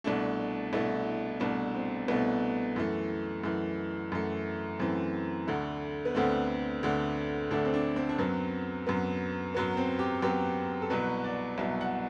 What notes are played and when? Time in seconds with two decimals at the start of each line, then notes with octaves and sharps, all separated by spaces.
0.04 C2 B2 A3 D4
0.73 C2 B2 A3 E4
1.40 C2 B2 A3 D4
1.75 C4
2.08 C2 B2 A3 B3
2.76 F#2 E3 A3
3.44 F#2 E3 A3
4.12 F#2 E3 A3
4.79 F#2 E3 A3 C4
5.48 D2 D3 A3
6.05 B3
6.15 D2 D3 A3 C4
6.83 D2 D3 A3
7.50 D2 D3 A3 D4
7.65 C4
7.74 D4
7.96 C4
8.09 D4
8.19 F#2 F#3 B3 C4
8.87 F#2 F#3 B3
9.55 F#2 F#3 B3
9.77 C4
9.99 G4
10.22 F#2 F#3 B3 G4
10.82 A4
10.90 C2 B2 F#3 B4
11.24 D5
11.58 C2 B2 F#3 E5
11.81 F#5